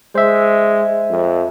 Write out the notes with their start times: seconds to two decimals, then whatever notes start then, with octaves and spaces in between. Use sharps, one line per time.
0.15 G#3 C5 E5
1.10 F2